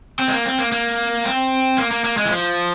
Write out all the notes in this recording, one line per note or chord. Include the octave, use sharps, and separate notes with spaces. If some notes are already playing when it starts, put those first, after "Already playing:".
C4
G#3
A#3
C4
A#3
A#3
C4
A#3
A#3
A#3
G#3
E3
F3